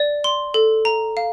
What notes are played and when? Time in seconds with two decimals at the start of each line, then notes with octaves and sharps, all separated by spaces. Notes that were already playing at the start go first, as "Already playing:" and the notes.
Already playing: D5
0.24 C6
0.54 A4
0.85 A#5
1.17 F5